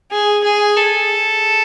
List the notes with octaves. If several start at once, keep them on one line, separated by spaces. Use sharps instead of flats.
G#4
G#4
A4